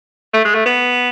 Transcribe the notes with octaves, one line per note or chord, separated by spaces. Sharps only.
A3
G#3
A3
B3